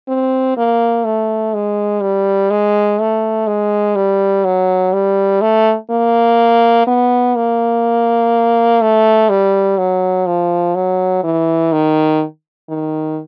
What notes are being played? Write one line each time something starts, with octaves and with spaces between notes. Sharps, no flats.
C4
A#3
A3
G#3
G3
G#3
A3
G#3
G3
F#3
G3
A3
A#3
B3
A#3
A3
G3
F#3
F3
F#3
E3
D#3
D#3